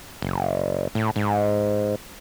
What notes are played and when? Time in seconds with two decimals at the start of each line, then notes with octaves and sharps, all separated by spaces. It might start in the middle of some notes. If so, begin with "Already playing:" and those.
0.22 F#1
0.95 A2
1.16 G#2